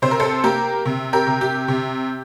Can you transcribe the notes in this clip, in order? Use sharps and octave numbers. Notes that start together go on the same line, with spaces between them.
C3 C5
A#4
A4 C5
A#3 G4 A#4
C3
G4 A#4
C3
G4
C3